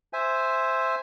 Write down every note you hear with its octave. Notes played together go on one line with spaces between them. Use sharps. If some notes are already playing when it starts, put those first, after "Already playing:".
C5 E5 G#5